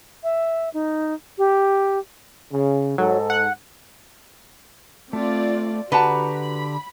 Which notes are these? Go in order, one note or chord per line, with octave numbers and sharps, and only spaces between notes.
E5
D#4
G4
C#3
G#2 F#3 A4
F#5
A3 C4 F4 D5
D3 F#4 G4 B4 D5 F#5 A5 A#5
B5